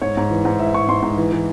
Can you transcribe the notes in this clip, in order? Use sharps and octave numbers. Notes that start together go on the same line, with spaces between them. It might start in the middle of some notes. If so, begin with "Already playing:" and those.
G#2 C#5
G#2
E3
G#2
E3 E5
G#2 C#6
G#2 C6
G#2
E3
E3